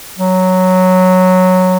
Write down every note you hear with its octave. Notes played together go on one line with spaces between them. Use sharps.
F#3